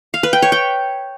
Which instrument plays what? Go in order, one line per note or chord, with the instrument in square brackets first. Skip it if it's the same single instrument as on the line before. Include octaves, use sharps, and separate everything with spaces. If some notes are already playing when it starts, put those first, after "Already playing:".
[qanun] F5
B4
G5
C#5
G5